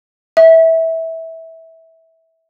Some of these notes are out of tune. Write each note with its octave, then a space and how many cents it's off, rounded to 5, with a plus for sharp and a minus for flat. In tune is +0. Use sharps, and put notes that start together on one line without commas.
E5 -20